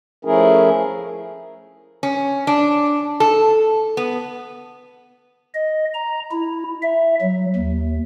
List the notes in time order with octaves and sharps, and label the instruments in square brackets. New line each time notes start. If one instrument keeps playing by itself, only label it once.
[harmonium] F3 A3 C#4 E4 G#4 A#4
[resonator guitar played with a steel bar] C#4
D4
A4
B3
[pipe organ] D#5
A#5
E4
E5
F#3
D#2